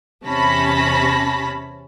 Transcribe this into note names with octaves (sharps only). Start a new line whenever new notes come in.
E2 C3 C#4 A5 B5 A#6